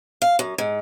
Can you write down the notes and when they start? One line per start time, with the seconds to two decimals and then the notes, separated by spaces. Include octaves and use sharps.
0.22 F5
0.39 F#2
0.58 G#2